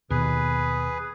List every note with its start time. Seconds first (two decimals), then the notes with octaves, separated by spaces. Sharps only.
0.10 D#2 B2 G#4 B4